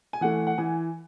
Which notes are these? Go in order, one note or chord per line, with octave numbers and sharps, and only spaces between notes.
G#5
E3 A3 F#5
F#5
E3 G#5